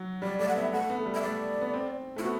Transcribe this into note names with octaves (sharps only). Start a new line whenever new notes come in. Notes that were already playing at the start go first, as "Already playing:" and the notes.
Already playing: F#3
G3 D5
A3 D5
F#5
B3 E5
A3 F#5
B3
A3
G3
E5
A3 D5
B3
C4
A3 E4
B3 F#4